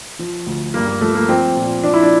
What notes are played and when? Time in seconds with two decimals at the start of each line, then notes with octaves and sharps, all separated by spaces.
0.19 F3
0.46 D2
0.74 G2 A#3
0.87 A#3
1.01 F3 A3
1.15 A#3
1.29 F3 C4
1.56 A#2
1.83 F3 D4
1.93 E4
2.03 D4